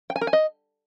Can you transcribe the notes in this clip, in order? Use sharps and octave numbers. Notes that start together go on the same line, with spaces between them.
G5
G#5
A#4
G#5
D#5